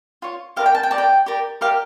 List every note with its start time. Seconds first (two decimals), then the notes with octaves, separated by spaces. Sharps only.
0.22 F4 C#5
0.56 G4 A#4 D5 F5
0.66 G5
0.75 A5
0.83 G5
0.91 G4 A#4 D5 A5
0.98 G5
1.26 G4 A#4 D5
1.61 G4 A#4 D5 F5